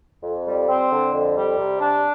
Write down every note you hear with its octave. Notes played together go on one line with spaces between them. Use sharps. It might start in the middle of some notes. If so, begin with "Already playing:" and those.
F2
G3
C4
D3
F2
G3
C3
D4